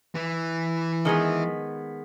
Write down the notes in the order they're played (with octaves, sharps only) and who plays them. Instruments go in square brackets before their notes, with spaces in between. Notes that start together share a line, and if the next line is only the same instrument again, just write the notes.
[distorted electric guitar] E3
[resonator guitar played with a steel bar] D#3 G#3 B3